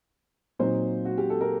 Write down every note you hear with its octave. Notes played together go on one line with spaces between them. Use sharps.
A#2 F#3 C4 D#4 C5
F#4
G4
A4
A#4